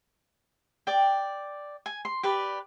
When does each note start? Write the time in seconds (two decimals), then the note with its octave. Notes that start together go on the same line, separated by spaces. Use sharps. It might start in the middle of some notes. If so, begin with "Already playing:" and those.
0.87 D5 G5
1.86 G#5
2.05 C6
2.23 G4 B4 D5